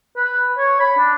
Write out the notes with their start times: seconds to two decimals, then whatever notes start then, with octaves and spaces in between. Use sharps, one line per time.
0.17 B4
0.58 C#5
0.80 B5
0.98 D4